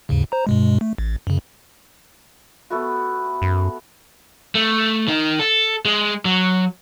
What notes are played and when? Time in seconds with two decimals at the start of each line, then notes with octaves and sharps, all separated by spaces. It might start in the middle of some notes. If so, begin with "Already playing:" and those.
0.09 D#2 G#2 C#3
0.32 C5 A#5
0.47 G2 B2 G#3
0.81 A3
0.98 A1
1.27 F#2 C#3
2.70 A3 B3 F#4
3.42 F#2
4.55 A3
5.08 D#3 D#4
5.40 A4
5.85 G#3
6.25 F#3